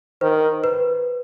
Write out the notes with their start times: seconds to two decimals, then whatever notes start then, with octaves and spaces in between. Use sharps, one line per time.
0.21 D#3 C5
0.64 B4